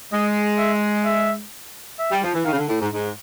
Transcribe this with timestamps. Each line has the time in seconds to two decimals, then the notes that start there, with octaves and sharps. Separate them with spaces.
0.12 G#3 D#5
0.58 E5
1.05 E5
1.99 E5
2.11 G3
2.23 F3
2.34 E3
2.45 D#3 F5
2.52 C#3
2.58 D3
2.68 A2
2.81 G#2
2.92 G#2